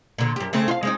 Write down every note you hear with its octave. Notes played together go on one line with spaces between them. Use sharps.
A#2 D3
F#2 G4
C#3 A3 C4
F4 F5
G#3 C4 D#4